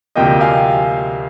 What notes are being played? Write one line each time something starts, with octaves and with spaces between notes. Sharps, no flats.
D2 C3 F3 A#3 D#5 G5
F5 G#5